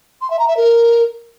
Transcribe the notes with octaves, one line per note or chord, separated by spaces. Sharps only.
C6
E5
A#5
E5
A#4